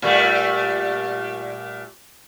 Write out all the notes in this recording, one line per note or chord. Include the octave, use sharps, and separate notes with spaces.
A#2 G3 A3